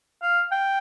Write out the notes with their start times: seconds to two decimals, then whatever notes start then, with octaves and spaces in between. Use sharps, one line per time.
0.22 F5
0.52 G5